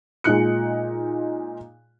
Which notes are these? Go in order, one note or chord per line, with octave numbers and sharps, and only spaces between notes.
A#2 G#3 D#4 F4 F#6 C#7